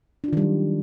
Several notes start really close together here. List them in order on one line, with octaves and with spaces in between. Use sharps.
D4 F4 D#3 G3 F#3